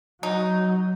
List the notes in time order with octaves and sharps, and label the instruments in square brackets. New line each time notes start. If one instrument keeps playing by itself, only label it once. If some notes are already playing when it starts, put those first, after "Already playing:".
[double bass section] F#3 [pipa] D#4